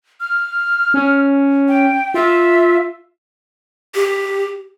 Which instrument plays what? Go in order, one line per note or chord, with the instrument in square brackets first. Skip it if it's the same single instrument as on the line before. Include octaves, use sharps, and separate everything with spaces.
[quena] F6
[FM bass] C#4
[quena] G5
[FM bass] F4 [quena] E5
[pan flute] G4